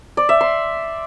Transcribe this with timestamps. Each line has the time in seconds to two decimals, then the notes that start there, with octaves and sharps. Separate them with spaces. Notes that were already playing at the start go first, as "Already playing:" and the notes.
0.17 D5
0.29 E5
0.41 C6